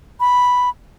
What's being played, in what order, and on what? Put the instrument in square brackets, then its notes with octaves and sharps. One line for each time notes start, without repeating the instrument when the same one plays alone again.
[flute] B5